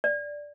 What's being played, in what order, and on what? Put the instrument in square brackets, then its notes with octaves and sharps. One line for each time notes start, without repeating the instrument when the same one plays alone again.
[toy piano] D5